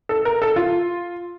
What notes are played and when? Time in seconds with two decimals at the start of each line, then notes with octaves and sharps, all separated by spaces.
0.09 A4
0.25 A#4
0.42 A4
0.56 F4